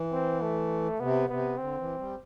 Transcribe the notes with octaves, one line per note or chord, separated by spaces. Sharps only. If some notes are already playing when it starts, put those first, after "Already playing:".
Already playing: E3
C4
A3
C3 B3
C3 B3
D3 C4
E3
G3